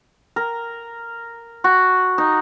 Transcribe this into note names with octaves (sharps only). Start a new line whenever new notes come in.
A#4
F#4
D#4